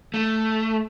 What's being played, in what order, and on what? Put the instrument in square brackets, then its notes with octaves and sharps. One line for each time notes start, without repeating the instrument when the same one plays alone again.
[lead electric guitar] A3